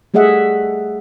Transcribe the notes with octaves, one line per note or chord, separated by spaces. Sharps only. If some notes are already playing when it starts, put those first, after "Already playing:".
G3 A3 G#4 D#5 E5 F#5